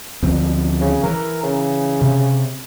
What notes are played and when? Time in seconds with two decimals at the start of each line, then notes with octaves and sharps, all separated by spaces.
0.23 D2 F3 C4
0.81 C#3
1.03 E3 A#4
1.43 C#3
2.01 C3